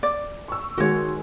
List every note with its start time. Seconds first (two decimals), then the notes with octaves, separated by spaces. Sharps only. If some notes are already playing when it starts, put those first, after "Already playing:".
0.03 D5
0.48 C#6 E6
0.78 D#3 G#3 F#4 C#5